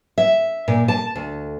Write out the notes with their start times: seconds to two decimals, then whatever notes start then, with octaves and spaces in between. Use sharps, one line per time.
0.18 E5
0.68 A#2
0.88 A5
1.16 D2